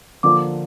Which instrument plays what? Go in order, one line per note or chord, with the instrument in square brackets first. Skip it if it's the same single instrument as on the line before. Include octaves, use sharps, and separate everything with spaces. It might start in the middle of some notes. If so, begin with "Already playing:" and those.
[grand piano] D3 F3 A#3 D4 [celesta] D6